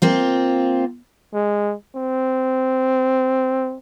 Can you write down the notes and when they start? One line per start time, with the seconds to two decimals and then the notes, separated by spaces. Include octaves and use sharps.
0.02 A#3 C4 F4
1.33 G#3
1.95 C4